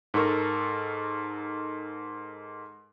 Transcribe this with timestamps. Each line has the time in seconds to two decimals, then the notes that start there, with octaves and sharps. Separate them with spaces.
0.14 G#2 A4 A#4 C#6